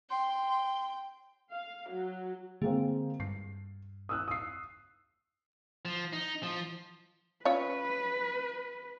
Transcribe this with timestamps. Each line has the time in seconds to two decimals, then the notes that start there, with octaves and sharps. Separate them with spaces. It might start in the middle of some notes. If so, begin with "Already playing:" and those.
0.10 G5 C6
1.50 F5
1.89 F#3
2.62 D3 G#3 A#3 C4
3.20 G2 C7
4.09 D#6 E6 F#6
4.28 D#6 C7
5.85 F3
6.13 D#4
6.43 F3
7.45 C#4 F4 B4 C#5